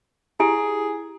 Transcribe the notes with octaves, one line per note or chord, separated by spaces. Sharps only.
E4 G4 G#4 G#5